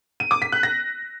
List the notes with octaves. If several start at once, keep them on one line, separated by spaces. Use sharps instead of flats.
D#7
D6
B6
F#6
A#6